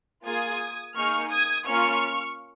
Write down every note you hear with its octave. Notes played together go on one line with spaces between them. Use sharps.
A#3 F4 G#4 D#6 G#6
A#3 D#4 G#4 C#6 F6
D#6 G#6
A#3 C#4 F4 C#6 F6